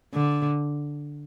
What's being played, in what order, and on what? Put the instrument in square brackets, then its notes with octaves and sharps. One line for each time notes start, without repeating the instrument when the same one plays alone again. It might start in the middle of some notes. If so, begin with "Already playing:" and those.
[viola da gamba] D3